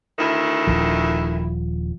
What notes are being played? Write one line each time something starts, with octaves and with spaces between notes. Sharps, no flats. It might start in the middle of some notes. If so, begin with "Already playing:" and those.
D2 D#3 E4
D#1 C2 F3